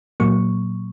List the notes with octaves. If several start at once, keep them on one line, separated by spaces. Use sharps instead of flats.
A#2 F#3 A#3 C#6